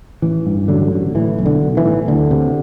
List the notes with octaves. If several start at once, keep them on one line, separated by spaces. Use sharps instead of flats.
A1 E3
G2
A1 D3 F#3
D3
A2 E3
B1
D3
B1
E3
A2
D2 D3
C3